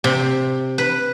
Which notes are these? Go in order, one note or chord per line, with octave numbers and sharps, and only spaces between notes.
C3
B4